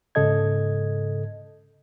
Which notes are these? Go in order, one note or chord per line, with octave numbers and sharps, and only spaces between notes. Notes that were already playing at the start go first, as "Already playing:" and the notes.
G#2 C#3 A4 D#5 G#6